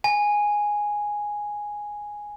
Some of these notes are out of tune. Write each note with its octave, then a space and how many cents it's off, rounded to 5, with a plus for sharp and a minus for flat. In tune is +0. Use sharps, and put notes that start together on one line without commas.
G#5 -5